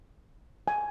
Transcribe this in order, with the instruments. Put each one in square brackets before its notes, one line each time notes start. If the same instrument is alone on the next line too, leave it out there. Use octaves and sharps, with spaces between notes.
[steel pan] G#5